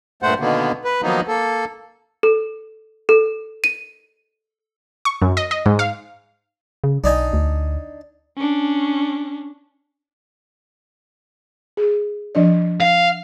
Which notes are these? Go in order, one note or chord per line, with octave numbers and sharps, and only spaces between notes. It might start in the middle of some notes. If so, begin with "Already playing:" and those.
G2 A#2 A3 C5 F#5
B2 D3 D#3 A#3 B3
B4
D#3 F3 F#3 A#3 B3 D#4
A#3 A4
A4
A4
D#7
C#6
F#2
D#5
D#5
G#2
F5
C#3
B1 D4 D#4 G#5
D2
C#4 D4
G#4
F3 D4 D5
F5